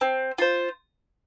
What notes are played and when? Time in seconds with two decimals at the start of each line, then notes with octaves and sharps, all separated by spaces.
0.01 C4
0.38 F4 C5